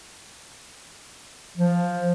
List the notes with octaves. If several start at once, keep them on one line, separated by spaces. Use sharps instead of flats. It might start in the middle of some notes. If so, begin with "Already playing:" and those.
F3